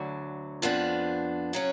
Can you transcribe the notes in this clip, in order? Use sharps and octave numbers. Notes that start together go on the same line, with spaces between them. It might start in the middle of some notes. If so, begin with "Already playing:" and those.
Already playing: D2 D3 F#3
F2 F3 B3 D4
C#3 F#3 C#4